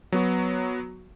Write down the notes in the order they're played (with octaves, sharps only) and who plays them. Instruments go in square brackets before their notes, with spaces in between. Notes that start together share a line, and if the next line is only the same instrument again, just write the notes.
[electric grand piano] F#3 B3 F#4